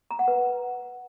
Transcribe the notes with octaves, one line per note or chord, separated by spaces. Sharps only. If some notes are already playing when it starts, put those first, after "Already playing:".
A#5
F#5
B4